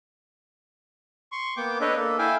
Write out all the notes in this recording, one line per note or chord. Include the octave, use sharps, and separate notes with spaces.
C6 C#6
A#3 B3 G5 D6
D4 A4 B4 C#5 D#5
A#3 A4
E4 A4 E5 F5 G5 G#5